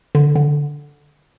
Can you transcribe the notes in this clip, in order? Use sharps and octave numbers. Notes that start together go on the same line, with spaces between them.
D3
D3